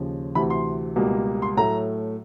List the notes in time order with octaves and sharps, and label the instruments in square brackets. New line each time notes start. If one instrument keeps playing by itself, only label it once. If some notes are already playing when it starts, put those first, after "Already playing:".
Already playing: [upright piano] D#2 C#3 F3
D2 C3 E3 B5
C6
C#2 B2 G3 A#3
C6
A2 F#3 A3 A#5